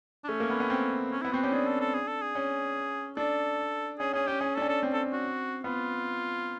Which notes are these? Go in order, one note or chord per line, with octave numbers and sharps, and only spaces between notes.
D4
A3 C#4
A#3
B3
B3
C4
C#4
B3 E4
C4 F#4
C#4 G4
D4 G#4
A4
A4
G#4
A4
G#4
C#4
D4 A4
C#4 G#4
C#4 G#4
C#4 G4
C#4 G#4
D4 A4
C#4
A4
C4
A4
F#4
B3 F4